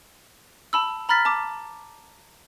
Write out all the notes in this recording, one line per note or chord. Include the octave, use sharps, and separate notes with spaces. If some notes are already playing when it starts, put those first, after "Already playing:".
A5 B5 E6
A#5 B5 F6 A6 B6
A5 D6